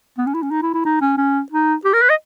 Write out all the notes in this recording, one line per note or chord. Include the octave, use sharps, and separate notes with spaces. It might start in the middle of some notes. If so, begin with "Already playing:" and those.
B3
C#4
E4
C#4
D#4
E4
E4
D#4
C#4
C#4
D#4
G4
A#4
B4
D#5